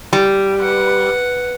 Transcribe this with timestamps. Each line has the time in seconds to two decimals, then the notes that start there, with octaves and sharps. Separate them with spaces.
0.13 G3
0.60 B4 F#5